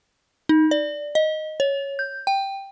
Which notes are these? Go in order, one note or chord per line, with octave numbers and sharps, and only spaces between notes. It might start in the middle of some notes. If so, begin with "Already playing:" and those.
D#4
D5
D#5
C#5
G6
G5